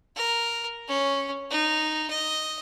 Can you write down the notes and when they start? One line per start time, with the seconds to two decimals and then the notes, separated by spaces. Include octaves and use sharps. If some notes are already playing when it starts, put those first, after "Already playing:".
0.16 A#4
0.88 C#4
1.50 D#4
2.10 D#5